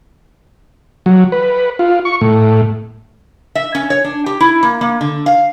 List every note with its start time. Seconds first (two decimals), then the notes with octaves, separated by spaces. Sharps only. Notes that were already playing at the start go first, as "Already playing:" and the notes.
1.06 F#3
1.32 B4
1.79 F4
2.05 C#6
2.21 A2
3.55 E5
3.75 C#4
3.90 C#5
4.04 D4
4.26 G4
4.41 E4
4.63 A#3
4.81 A#3
5.01 D3
5.26 F5